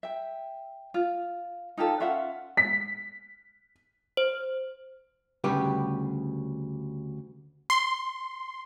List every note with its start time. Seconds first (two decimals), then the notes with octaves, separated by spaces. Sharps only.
0.03 E5 G5
0.94 F4
1.77 D#4 F4 G4 A4
2.00 C#4 F4 E5 F#5
2.57 B6
4.17 C5
5.44 D2 C#3 G3 G4 B4
7.70 C6